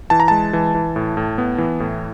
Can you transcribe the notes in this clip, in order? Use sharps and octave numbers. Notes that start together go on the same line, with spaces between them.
E3 A5
A#5
G#3 A5
E3
E3
A2
A2
B3
E3
A2